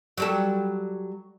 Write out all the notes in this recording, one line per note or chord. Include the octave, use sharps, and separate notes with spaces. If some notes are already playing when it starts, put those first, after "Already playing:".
F#3 G3 A4